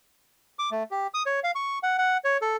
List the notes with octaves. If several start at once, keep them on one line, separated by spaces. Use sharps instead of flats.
D6
A3
G4
D#6
C#5
F5
C#6
F#5
F#5
C#5
A4